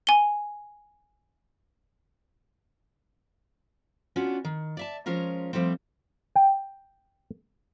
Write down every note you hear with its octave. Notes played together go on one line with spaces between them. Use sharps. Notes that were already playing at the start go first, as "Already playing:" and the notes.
G#5 G7
B3 C#4 D4 F4 F#4
D#3
D5 E5 A5
F3 G#3 C#4 F4 A#4
F3 G3 A3 C4
G5